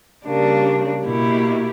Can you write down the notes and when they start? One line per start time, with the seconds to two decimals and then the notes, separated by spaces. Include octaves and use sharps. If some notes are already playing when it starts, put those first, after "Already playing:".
0.25 C#3 G3 A#3 D4
1.04 B2 A#3 E4 G4